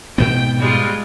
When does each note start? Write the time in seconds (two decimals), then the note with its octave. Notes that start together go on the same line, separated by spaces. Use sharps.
0.18 G#2 B2 B3 G5
0.60 G3 G#3 F4